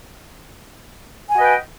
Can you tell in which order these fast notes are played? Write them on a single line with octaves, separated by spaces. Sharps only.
G#5 F#4 D#5 B4 G5